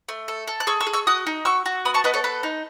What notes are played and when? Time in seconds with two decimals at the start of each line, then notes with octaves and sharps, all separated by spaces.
0.09 A3
0.28 A4
0.47 A4
0.60 F#6
0.67 G#4 C#6 E6
0.80 C#6 E6
0.87 G#4
0.93 C#6 E6
1.07 F#4 D#6 F#6
1.27 D#4
1.45 F#4 C#6 E6
1.66 F#4
1.85 B3 B5 D#6
1.94 A5 C#6
2.04 B3 B4 D#5
2.14 A4 C#5
2.24 A4 B4
2.43 D#4